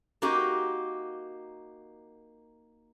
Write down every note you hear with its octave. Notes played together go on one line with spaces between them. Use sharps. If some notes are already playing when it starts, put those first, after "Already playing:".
A#3 D#4 F#4 G4